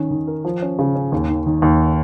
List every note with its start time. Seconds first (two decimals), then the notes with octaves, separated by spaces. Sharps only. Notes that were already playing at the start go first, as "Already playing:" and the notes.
Already playing: D#3 C#4
0.11 D#3
0.27 A#4
0.45 F3
0.62 C#4
0.79 C#3
0.95 C#4
1.12 D#2
1.29 D#3
1.47 D#3
1.62 D#2